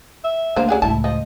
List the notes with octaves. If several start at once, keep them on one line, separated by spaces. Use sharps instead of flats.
E5
D2 D3 A#3 C5
C#4 G#4 F#5
C#2 A2 E4 A5
F3 D#5